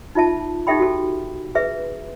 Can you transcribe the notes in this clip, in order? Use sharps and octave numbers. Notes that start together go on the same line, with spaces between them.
D#4 F4 E5 A5
D#4 G4 A4 E5 G5 B5
F#4 A4
G#4 B4 E5